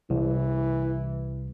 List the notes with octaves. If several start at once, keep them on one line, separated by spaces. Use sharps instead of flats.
C2 E3